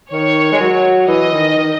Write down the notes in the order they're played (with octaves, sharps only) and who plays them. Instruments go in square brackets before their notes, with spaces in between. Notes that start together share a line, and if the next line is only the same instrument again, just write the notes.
[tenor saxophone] D#3 [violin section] C#5
[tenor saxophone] G#3
F#3
[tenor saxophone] E3 [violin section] D#5
[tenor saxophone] D#3
D#3